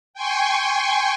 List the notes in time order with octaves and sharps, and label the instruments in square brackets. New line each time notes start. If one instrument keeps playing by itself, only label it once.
[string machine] G5 G#5 C6 C#6